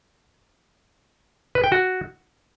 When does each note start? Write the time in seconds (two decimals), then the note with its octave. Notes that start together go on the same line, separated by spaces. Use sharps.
1.55 B4
1.64 G5
1.72 F#4